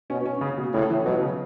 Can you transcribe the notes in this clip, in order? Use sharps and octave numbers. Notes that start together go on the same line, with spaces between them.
B2 C#4
C#4
C#3
B2
A2 C#3
E3
B2 F#3
C#3